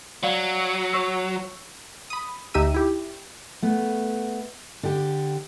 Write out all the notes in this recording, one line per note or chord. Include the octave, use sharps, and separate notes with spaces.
F#3 D5 F5
C#5 C#6 E6
B5 D#6
D2 D#4 G4 E5 E6 D#7
E4 G4
A3 B3
D3 G4